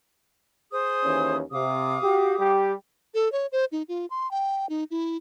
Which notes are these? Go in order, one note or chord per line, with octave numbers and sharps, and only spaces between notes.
G#4 C5 D#6
D#2 E3 C#4
C3 F5 D6 D#6
F#4 G4
G3 G4
A4
C#5
C5
D#4
F4
C6
G5
D#4
E4